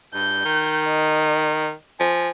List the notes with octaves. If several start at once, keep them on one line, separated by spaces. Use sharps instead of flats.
G2 G6
D#3
D#5
F3 G#5